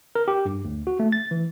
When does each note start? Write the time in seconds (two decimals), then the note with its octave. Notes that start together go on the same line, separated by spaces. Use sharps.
0.15 A#4
0.28 G4
0.45 G2
0.65 D2
0.87 F#4
1.00 A3
1.12 A6
1.31 E3